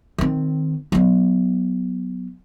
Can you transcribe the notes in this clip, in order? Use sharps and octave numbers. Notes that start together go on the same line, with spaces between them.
D#3 C4
F#3 B3